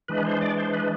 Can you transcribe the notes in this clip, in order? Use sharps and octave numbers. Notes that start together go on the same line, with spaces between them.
E3 G#3 D4 B4
C5
D5
C5
B4